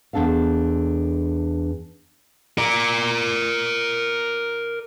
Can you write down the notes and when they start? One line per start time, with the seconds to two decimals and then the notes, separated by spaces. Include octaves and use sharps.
0.13 E2 E3 D4 A4 F5
2.58 A#4 D5